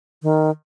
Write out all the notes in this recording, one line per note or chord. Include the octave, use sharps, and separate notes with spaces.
D#3